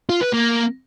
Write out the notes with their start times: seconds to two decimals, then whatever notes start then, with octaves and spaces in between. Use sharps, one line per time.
0.09 F4
0.21 B4
0.33 A#3